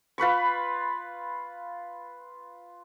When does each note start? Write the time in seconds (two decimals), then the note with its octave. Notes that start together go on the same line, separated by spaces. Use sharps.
0.18 F4 B4 B5 C#6